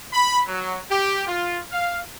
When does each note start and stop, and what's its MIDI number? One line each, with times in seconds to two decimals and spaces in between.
0.13 0.41 83
0.47 0.77 54
0.90 1.26 67
1.28 1.60 65
1.72 1.99 77